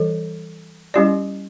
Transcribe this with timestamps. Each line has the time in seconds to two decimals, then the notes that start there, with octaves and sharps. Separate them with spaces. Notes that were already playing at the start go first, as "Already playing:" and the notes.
Already playing: E3 G3 A4 C#5
0.94 G3 C#4 E4 G4 D5